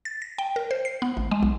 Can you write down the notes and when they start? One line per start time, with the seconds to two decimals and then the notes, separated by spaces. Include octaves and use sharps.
0.05 A6
0.22 A#6
0.38 G5
0.56 A#4
0.71 C5
0.85 C7
1.02 B3
1.17 A1
1.31 G#3
1.43 B1